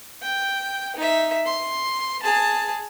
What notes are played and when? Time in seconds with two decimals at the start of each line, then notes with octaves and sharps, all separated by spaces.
0.22 G5
0.96 D#4 E5
1.46 C6
2.22 G#4 A5